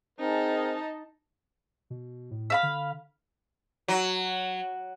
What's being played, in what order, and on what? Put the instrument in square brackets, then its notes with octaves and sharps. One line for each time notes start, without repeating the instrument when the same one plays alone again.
[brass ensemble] C4 G#4 A#4 [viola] D#4 A5
[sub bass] B2
A2
[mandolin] E5 F5 B5
[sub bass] D3
[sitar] F#3